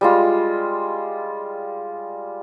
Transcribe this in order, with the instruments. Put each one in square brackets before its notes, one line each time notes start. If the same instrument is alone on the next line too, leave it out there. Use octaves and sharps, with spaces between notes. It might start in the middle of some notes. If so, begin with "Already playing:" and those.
[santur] G3 G#3 F4